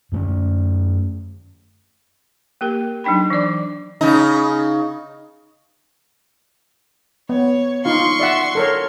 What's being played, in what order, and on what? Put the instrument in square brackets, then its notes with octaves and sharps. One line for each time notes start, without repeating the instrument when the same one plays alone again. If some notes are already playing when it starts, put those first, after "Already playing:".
[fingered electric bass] F#2 A3 C#4
[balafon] A#3 G4 A#4
F#3 D4 D#4 G5 B5
E3 D4 D5 D6
[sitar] C#3 D#4
[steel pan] B3 [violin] C#5
[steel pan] D#4 F4 F5 [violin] C6 C#6
[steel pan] D5 E5 F#5
A4 A#4 C#5